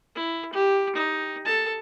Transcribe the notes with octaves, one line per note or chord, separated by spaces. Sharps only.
E4
G4
D#4
A4 A5